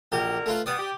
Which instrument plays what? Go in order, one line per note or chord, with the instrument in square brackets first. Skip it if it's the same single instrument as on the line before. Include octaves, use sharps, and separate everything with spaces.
[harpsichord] A#1 G4 [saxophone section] F#2 D3 A#4
[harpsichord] A3 F4 B4
[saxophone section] G3 B3 [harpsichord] D5 D#6
[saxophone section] G4